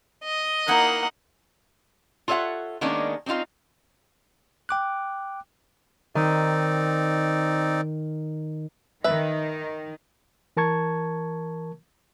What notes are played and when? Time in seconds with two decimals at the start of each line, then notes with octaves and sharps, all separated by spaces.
0.24 D#5
0.68 A#3 D#4 E4 F#4 F#5
2.28 F4 A4 C#5 E5 F#5
2.81 D#3 G#3 A#3 B3 C#4 D4
3.26 C4 C#4 D#4 F4 F5
4.69 G5 D6 F#6
6.15 D#3 C4 D#4 D5
9.04 D#3 B4 E5
10.57 E3 A#4 A5 C#6 G#6